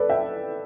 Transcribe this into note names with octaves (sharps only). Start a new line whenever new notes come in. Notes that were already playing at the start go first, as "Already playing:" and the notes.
Already playing: A4 B4 D5
E5 G5